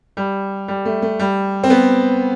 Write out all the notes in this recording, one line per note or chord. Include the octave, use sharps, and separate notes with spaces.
G3
G3
A3
A3
G3
C4
B3